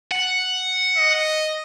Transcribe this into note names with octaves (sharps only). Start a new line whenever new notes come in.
F#5
D#5